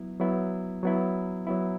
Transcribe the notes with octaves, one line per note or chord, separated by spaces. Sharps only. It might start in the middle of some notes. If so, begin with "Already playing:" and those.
Already playing: F#3 B3 E4
F#3 B3 E4
F#3 B3 E4
F#3 B3 E4